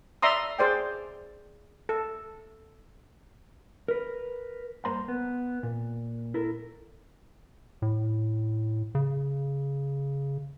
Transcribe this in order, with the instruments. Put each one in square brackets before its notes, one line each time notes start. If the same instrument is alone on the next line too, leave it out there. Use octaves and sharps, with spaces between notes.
[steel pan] D5 E5 A#5 C6 D#6
G#4 C5 D5 G5
A4
[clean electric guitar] A#4 B4
G2 A#3 C5 A#5 C6
B3
A#2
E4 A4 A#4
[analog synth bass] A2
C#3